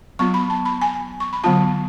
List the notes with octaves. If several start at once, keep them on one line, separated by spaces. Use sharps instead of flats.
F#3 B3 F4 C#6
B5
A5
B5
G#5
C#6
B5
D3 F#3 B3 F4 A5